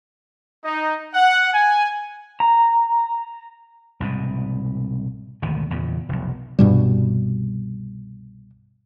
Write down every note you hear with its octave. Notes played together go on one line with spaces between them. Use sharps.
D#4
F#5
G#5
A#5
C2 G#2 B2
G#1 D2 B2 D#3
E2 A#2 C#3
F1 B1
C2 G2 B2 G3